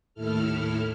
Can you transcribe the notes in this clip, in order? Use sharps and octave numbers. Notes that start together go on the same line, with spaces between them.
D#2 A2 E4 A4 F6